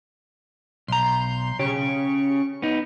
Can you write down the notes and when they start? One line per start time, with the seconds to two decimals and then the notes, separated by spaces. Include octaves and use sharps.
0.88 B1 A#5 C6 G6
1.59 C#3 G4 C#6
2.62 B3 D#4